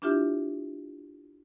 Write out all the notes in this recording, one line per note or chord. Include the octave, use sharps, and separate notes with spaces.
D4 E4 F4 G4 E5